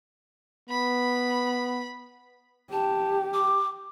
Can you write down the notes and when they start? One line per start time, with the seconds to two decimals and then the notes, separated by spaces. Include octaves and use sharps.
0.69 B3 B5
2.72 G4 A5
3.34 D6